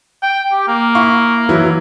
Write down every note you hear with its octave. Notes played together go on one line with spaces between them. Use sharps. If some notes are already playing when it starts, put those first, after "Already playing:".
G5
G4
A#3
E4 F5 C#6
E3 F#3 E4